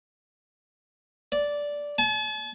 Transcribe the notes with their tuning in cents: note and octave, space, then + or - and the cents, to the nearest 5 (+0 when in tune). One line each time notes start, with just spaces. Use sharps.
D5 -10
A5 -45